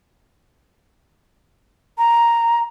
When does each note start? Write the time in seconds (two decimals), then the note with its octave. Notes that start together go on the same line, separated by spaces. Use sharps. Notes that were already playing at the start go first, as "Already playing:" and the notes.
1.98 A#5